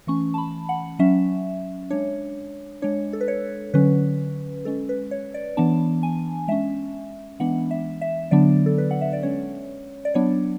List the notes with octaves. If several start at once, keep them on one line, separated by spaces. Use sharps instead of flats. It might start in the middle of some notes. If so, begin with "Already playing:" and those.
E3 A3 C#4 C#6
A5
B5
F#5
F#3 C#4 E5
G#3 D4 C#5
G#3 D4 C#5
A4
B4
C#5
D3 F#3 C#4 B4
G#3 C#4 A4
B4
C#5
D5
E3 B3 D4 A5
G#5
G#3 C#4 E5
E3 G#3 B3 D4 F#5
E5
E5
D3 F#3 B3 D4 D5
A4
B4
F#5
E5
D5
G#3 C#4 C#5
D5
F#3 B3 D4 C#5